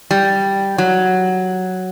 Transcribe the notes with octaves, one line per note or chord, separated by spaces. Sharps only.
G3
F#3